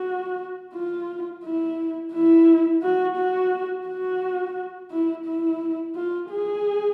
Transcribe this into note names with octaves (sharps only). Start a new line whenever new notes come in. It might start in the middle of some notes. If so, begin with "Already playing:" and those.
Already playing: F#4
F4
E4
E4
F#4
F#4
F#4
E4
E4
F4
G#4